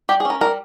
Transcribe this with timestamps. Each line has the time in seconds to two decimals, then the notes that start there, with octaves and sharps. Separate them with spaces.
0.09 G3 G4
0.20 G#4
0.25 C#4 A#4
0.41 G3 A#4